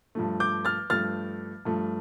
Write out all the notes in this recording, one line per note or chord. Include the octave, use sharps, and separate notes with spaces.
G2 F3 A3
D6 G6
F6 A6
G2 F3 A3 F6 A6
G2 F3 A3